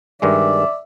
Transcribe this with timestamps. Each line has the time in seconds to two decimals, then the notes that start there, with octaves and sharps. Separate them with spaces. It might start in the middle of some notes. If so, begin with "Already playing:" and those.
0.22 G2 D#3 G#3 D5 E5